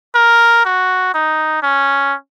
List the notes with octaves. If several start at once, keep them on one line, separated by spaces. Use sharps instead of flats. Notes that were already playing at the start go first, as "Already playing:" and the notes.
A#4
F#4
D#4
C#4